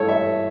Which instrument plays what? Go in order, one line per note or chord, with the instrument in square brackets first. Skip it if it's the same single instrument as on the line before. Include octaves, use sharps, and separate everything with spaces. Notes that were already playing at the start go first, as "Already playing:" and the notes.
Already playing: [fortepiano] G2 E3 A3 A4 C#5
E5